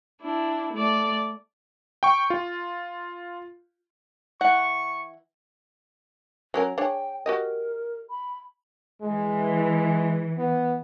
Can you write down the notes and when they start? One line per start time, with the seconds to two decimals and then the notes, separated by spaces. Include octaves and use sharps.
0.21 D4 E4
0.73 A3 D5
2.03 G5 C#6
2.30 F4
4.41 E3 F#5 C#6
6.54 F#3 C#4 A#4
6.78 D4 G#4 C#5 G5
7.26 F#4 G4 A#4 D#5
8.10 B5
9.02 E3 G#3
10.38 B3